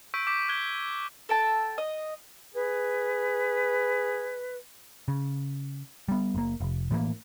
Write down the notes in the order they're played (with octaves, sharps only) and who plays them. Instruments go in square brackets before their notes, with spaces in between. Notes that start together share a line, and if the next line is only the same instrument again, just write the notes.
[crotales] C#6 E6 G6 B6 D7
D6 G6 B6
F#6 G#6 G7
[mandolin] A4 G5 A5
D#5
[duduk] G#4 [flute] B4
[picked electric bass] C#3
G3 B3
F#1 A#3
F1
A2 E3 F#3 A#3